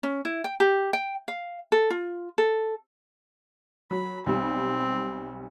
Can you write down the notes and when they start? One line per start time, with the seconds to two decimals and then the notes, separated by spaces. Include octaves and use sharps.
0.03 C#4
0.25 E4
0.44 G5
0.60 G4
0.93 G5
1.28 F5
1.72 A4
1.90 F4
2.38 A4
3.91 F#3 B5
4.26 B1 G3 C4